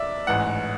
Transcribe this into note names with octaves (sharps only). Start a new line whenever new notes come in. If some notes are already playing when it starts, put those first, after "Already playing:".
Already playing: B1 D5 E5
A1 G#2 E3 F#5